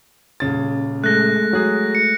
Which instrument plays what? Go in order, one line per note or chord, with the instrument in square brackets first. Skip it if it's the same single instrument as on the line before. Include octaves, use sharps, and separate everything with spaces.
[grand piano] D#1 C#3 A6
[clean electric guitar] G#3 A3 [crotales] F#6 A#6
[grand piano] F#3 G#4
[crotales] C#7